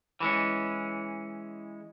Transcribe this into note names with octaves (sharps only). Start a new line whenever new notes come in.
E3 G#3 C#4